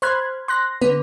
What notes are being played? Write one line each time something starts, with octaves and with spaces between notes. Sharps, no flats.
C5 B5 C6 F6 F#6 G#6
C6 F#6 A#6
D3 B3 B4